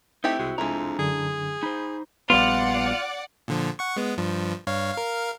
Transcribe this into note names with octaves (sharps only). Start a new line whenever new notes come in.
A3 C4 D#4 E4 G4
C2 G#3 F#4
F2 G#3 D4 E4 A#5
F#2 D3 G#4
D#4 C5 B5
A#1 G3 B3 F4 D5 F#5
A#2 D3 F3
F#5 C#6
G#3 B3
G2 F3
G2 C#5 F5
A#4 F5